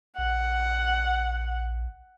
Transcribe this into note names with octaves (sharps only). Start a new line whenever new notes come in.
A#1 F#5